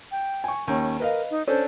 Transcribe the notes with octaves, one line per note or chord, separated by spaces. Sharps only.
G5
G#5 C#6
D#2 C#4
A#4 B4 D#5 F5
D#4
C#4 D4 A4 C5